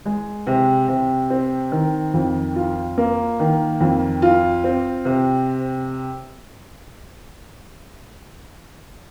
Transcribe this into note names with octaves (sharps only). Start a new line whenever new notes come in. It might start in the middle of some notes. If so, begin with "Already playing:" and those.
G#3
C3
C3
C4
D#3
F2
F4
A#3
D#3
F2
F4
C4
C3